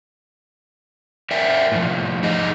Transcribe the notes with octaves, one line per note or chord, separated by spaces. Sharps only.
A#4 D5 E5 G5 G#5
A2 F3
D#4 G4 G#4 D#5